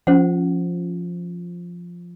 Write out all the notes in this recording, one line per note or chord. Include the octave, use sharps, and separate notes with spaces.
F3 C#4 C5 F#5